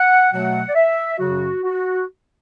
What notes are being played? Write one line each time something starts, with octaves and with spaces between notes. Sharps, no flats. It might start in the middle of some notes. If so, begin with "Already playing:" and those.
Already playing: F#5
B2 F#3 A3 F#5
D5
E5
F#2 C#3 F#3 F#4
F#4